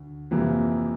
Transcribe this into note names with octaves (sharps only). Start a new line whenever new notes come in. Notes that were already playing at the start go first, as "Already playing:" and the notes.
Already playing: D2
F2 C3 E3 A#3